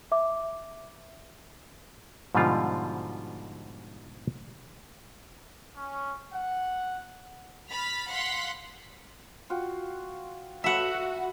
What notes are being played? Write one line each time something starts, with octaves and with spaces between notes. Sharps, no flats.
E5 D6
G#2 B2 D3 F3 G3 F4
C#4
F#5
B5 F6 A6 B6
F5 F#5 C6 F#6 B6
F4 F#4 G5
A3 F#4 B4 E5 F#5